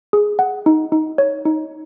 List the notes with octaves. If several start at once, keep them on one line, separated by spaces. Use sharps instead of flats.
G#4
F#5
D#4
D#4
C#5
D#4